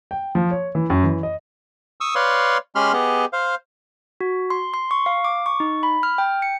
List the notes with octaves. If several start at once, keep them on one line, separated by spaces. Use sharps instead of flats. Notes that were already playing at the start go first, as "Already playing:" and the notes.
G5
F3
C#5
E3
F#2
E3
D#5
C#6 D#6 E6
B4 C#5 D5 F5 C6
G#3 C#4 G4 B5 C6 F6
B3 G4 G#4 D#5
C5 F5
F#4
C6
C6
C#6
F5
D6
C#6
D#4
B5
F6
G5
C#7